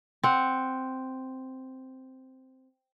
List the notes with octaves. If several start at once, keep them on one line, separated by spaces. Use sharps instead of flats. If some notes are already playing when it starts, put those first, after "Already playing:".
C4 F#5